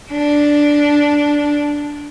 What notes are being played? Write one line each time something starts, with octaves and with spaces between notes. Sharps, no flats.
D4